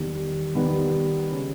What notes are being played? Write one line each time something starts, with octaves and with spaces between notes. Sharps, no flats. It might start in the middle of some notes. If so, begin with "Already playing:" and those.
Already playing: E2 D#3 G3
D#3 G3 B3 D#4
C#3 G3 C#4